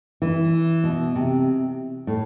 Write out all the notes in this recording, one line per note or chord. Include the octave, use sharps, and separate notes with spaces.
E3
B2
C3
A2